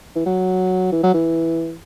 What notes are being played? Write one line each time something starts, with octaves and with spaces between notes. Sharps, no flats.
E3
F#3
E3
F#3
E3